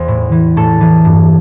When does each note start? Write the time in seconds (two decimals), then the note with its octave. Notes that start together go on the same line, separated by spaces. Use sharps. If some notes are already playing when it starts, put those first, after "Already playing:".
Already playing: E2 E3 C5
0.08 A2
0.32 E3
0.57 A2 A4
0.80 E3
1.05 G2